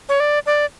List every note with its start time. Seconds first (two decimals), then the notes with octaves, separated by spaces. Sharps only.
0.09 C#5
0.20 D5
0.46 D5